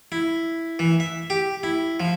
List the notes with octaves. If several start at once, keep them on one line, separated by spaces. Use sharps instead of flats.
E4
E3
E5
G4
E4
F3